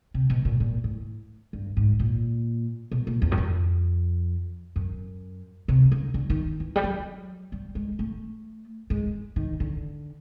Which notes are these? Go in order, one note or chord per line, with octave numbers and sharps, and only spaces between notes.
C3
B2
A#2
A#2
A2
G2
G#2
A#2
B2
A#2
E2
F#2
F2
F#2
C3
C#3
D3
D#3
E3
G3
F#3
G3
G#3
A3
G#3
D#3
D3